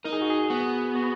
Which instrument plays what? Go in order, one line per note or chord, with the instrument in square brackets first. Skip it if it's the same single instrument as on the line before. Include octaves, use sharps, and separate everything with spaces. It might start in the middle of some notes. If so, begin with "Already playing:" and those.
[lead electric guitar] D#4 [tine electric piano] A#4
[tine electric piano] G#4
F#4
G#4
[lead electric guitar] B3 [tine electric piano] F#4
[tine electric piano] F#4